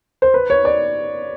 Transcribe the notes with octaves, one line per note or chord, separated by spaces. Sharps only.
C5
B4
C#5
D5